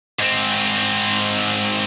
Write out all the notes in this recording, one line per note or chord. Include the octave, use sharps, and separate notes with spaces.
G#2 C4